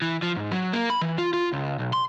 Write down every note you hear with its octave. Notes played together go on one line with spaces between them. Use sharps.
E3
F3
G#2
F#3
A#3
B5
E3
F4
F4
C#2
B1
C6